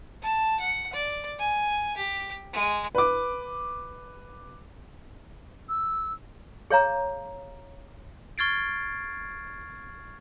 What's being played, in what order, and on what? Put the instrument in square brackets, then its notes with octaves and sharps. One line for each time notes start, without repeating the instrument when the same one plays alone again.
[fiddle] A5
F#5
D5
G#5
G4
G#3
[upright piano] B4 D6
[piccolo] E6
[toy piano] G#4 C#5 F5 A#5
[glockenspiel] C#6 F6 G#6 A6 C7 D7